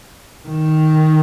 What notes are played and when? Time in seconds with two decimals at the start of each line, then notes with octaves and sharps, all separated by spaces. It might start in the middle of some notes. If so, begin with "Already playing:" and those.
0.48 D#3